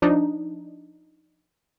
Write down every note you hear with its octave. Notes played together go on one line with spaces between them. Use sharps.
F3 D4 D#4